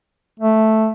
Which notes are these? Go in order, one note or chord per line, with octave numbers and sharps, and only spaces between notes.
A3